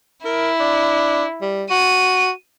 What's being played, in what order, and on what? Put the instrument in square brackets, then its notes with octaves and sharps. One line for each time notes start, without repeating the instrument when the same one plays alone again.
[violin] E4 [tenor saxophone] A#4
[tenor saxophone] D4
G3
[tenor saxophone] F#4 [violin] D#7